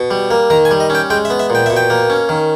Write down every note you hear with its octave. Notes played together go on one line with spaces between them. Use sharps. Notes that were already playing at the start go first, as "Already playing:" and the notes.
Already playing: B2
G3
A#3
D#3 A#5
G#5
G3
D#5
C#4 G5
G#3 G5
E5
B3
E5
A#2 G5
B2 E5
G5
A#3
C#4
D#3